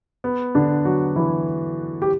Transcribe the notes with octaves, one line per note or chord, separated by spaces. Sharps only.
B3
D3 D4
F#3 F#4
E3 E4
G4